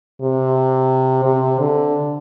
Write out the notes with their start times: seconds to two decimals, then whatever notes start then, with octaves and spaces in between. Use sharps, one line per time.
0.21 C3
1.25 C3
1.59 D3